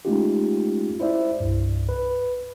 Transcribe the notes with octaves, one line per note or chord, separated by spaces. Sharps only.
G#3 A3 C#4 D#4 F4 G4
E4 C5 D5 E5
C2 G2
B4